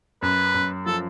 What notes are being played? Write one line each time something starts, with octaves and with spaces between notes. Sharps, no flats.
F#2 B4
F#2
F3 A4